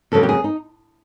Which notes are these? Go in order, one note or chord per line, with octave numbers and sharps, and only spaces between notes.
F2 C#3 F#3 A#3 A4
G4
G#4
D#4